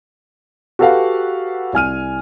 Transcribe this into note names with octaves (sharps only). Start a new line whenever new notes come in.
F#4 G4 A4 B4 F5 F#5
C2 G#5 F6 D#7